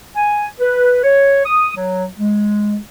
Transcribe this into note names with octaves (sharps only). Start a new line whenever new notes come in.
G#5
B4
C#5
D#6
F#3
G#3